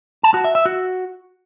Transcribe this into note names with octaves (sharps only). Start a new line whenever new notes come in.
A5
F#4
E5
E5
F#4